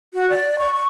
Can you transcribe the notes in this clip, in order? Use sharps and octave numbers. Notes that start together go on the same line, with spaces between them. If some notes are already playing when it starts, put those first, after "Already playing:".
F#4
D5
C#6
C#6